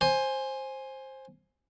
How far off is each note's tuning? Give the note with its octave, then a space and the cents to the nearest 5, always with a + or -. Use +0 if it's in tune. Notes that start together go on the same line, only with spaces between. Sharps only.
C5 +15 G#5 +0